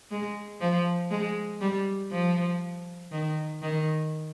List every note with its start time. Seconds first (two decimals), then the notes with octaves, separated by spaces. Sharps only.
0.11 G#3
0.61 F3
1.11 G#3
1.61 G3
2.11 F3
3.12 D#3
3.62 D#3